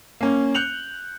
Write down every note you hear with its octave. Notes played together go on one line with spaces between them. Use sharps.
A#3 C#4
F#6 G6 C#7 F7 F#7